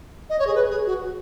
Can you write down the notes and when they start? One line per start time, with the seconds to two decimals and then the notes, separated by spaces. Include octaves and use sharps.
0.30 D#5
0.39 C#5
0.47 G#4
0.55 B4
0.70 G#4
0.86 F#4